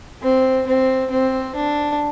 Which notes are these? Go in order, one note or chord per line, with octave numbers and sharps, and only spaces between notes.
C4
C4
C4
D4